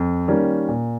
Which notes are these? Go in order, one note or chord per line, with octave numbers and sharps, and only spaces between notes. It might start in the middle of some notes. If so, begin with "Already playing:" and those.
Already playing: F2
D#3 G3 A#3 C#4
A#2